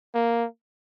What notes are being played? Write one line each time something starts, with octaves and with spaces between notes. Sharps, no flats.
A#3